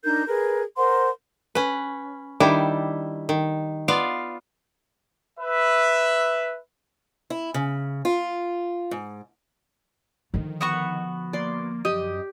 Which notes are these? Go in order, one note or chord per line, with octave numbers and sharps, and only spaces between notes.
D4 D#4 A#4 G6
G#4 A#4 B4
A#4 C5 F#5 C6
C#4 B4
D#3 G3 D4 E4
D#3
B3 F4 D5 F5
B4 E5
E4
C#3
F4
G#2
D3 D#3 F3
B3 F#4 C#6
A#3 D5 C6
F#2 G4 D#5